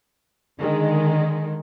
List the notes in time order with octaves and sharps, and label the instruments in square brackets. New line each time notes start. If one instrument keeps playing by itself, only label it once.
[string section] D3 D#3 G#3